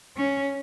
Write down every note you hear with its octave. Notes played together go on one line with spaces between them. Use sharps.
C#4